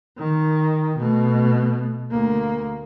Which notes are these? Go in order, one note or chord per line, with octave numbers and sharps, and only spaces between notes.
D#3
B2 A3
D2 A#3